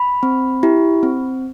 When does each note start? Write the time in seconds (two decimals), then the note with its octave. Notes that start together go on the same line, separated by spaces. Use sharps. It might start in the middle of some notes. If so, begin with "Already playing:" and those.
Already playing: B5
0.23 C4
0.63 E4 G4
1.03 C4